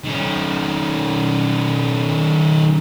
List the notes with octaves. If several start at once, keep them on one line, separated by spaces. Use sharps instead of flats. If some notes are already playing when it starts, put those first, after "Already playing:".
D#3 C#4